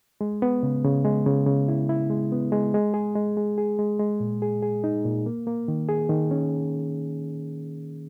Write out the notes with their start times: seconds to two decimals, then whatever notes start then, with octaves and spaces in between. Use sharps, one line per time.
0.21 G#3
0.42 B3
0.63 C#3
0.85 C#3
1.05 G#3
1.26 C#3
1.47 C#3
1.68 E4
1.89 E4
2.10 G#3
2.32 B3
2.52 G#3
2.74 G#3
2.94 G#4
3.15 G#3
3.37 G#3
3.58 G#4
3.79 G#3
3.99 G#3
4.20 A#2
4.42 G#4
4.62 G#4
4.84 D#4
5.05 A#2
5.26 A#3
5.47 A#3
5.68 D#3
5.89 G#4
6.09 D#3
6.31 C#4